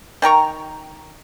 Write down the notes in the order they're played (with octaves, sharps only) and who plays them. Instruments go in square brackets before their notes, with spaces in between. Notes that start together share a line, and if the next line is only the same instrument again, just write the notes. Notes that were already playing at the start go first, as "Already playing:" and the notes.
[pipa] D#3 G5 A#5 C#6